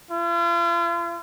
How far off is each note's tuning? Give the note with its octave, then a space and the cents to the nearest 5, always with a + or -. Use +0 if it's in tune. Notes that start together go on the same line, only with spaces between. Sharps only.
F4 -45